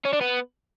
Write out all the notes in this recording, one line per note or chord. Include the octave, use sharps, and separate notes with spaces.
C#4
D4
B3